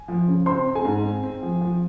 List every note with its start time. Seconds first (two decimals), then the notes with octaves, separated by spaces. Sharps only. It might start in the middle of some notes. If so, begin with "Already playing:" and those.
Already playing: G#5
0.08 F3
0.27 C#3
0.46 C4 C5 C6
0.66 C4
0.75 G#4 G#5
0.85 G#2
1.04 C4
1.23 C4
1.43 F3
1.61 F3